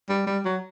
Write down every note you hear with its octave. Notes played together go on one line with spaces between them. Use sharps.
G3
G3
F#3